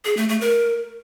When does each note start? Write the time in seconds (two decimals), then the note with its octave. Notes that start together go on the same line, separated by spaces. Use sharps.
0.05 G#4
0.17 A3
0.29 A3
0.41 A#4